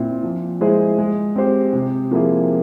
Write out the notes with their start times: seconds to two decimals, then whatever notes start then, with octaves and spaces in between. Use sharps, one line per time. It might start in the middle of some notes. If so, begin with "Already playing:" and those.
Already playing: A#2 C4 E4
0.23 F3
0.61 G#3 E4 G#4 C5
0.98 G#3
1.36 C4 G4 C5
1.73 C3
2.11 F3 A#3 E4 G#4